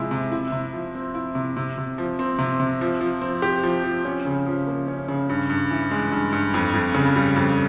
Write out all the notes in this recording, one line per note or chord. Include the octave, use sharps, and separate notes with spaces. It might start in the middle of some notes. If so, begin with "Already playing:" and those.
Already playing: C3 F3 G#3 E4
C3
E4
C3
F3
C4
E4
C3
C3
C3
F3
C4
C3
C3
F3
F3
C4
G4
F3
F3
C#4
C#3
F3
A#3
C#4
C#3
G2
G2
E3
G#3
G2
G2
F2
F2
C#3
G3
F2